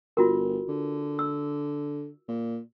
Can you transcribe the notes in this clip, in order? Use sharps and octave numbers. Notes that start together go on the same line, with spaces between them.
G1 F4 F#4 A#4
D3
E6
A#2